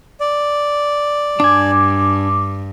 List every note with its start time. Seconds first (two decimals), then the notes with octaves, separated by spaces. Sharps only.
0.20 D5
1.40 G2 D4 G#5 D6